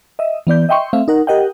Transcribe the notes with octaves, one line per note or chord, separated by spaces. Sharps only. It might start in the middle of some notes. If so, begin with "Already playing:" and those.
D#5 E5
E3 B3 D5 G6
D#5 E5 G5 C6 C#6
A3 C4 E5 F5
D#4 A#4 F#5
G4 A#4 D#5 F#5 G5